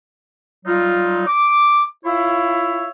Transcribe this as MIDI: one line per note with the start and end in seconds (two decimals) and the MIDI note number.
0.66 1.24 54
0.66 1.24 55
0.66 1.24 63
0.66 1.24 65
1.27 1.82 86
2.05 2.88 64
2.05 2.88 65
2.05 2.88 73
2.05 2.88 76
2.05 2.88 77